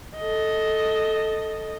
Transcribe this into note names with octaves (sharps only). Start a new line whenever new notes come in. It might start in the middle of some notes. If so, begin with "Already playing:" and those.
A4 D#5